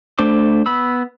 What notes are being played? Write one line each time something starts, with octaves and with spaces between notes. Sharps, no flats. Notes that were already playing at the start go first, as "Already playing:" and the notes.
A3 D4 C5 D6
B3 B5 E6